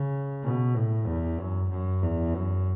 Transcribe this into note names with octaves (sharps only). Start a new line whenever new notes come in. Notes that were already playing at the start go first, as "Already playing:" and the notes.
Already playing: C#3
B2
A2
E2
F#2
F#2
E2
F#2